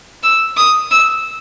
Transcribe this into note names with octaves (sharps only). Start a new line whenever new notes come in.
E6
D#6
E6